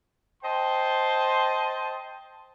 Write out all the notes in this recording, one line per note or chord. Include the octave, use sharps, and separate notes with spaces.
C5 D#5 G5 A5 C6